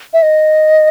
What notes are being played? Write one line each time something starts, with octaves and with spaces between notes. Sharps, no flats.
E5
D#5